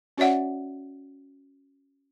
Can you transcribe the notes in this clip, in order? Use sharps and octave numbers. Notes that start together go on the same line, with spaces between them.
C#4 F#4 C#5 D5 E5 F#5